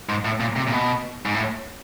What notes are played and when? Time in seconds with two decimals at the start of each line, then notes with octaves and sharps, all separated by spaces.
0.09 G#2
0.25 A2
0.40 A#2
0.56 C3
0.67 A#2
0.72 B2
1.26 G#2
1.35 A2